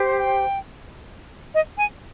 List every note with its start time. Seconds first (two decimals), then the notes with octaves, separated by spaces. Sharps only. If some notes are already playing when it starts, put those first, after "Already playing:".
Already playing: G4 C5
0.18 G5
1.54 D#5
1.77 G#5